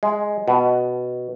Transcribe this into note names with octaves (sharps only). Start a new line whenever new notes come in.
G#3
B2